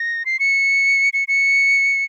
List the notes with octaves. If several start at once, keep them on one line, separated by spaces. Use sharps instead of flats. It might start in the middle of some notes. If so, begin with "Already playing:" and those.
Already playing: A#6
C7
C#7
C#7
C#7